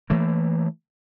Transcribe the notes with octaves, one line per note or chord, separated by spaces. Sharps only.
E3 A3 A#3